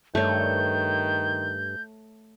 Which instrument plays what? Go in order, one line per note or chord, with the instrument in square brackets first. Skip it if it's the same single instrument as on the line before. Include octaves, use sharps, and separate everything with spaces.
[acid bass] G2 [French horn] D#3 [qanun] A3 C#5 [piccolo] G6